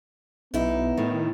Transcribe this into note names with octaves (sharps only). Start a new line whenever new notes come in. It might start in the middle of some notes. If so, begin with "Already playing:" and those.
B1 B3 D#4 E4
A2 D#3